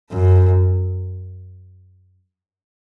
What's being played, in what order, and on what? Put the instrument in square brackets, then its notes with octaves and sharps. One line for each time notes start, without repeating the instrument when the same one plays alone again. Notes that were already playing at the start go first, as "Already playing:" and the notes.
[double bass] F#2